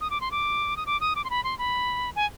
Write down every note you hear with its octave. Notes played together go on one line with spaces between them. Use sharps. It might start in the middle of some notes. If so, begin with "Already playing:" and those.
D#6
D6
C6
D6
D#6
D6
D#6
D6
C6
B5
C6
B5
G#5